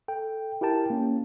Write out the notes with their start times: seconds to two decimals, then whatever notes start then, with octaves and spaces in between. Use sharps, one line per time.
0.08 A4 G5
0.61 E4 G4 A#4 G5 A5
0.90 A#3 C#4